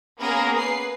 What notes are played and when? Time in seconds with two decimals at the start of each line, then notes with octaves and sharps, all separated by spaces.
0.19 A#3 B3 C#4 G#4 A#4
0.57 B4 C7